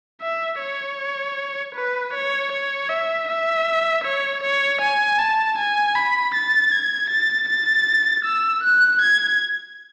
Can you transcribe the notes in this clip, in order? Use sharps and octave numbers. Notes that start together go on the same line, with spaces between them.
E5
C#5
B4
C#5
C#5
E5
E5
C#5
C#5
G#5
A5
G#5
B5
A6
G#6
A6
A6
E6
F#6
G#6